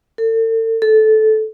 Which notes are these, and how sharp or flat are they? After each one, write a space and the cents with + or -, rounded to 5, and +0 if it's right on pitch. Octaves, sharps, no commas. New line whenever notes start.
A4 +40
A4 -15